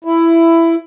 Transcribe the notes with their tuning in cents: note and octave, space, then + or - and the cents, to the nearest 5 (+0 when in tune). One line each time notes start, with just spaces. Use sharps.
E4 +10